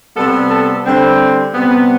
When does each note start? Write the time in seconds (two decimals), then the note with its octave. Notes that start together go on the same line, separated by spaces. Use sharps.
0.16 C3 G3 B3 A4
0.51 A4
0.84 D3 G3 C4
1.55 C3 G3 B3